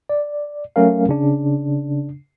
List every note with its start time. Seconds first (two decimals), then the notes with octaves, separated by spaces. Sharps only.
0.09 D5
0.76 F#3 A3 C#4 A#4 F5
1.09 C#3 D4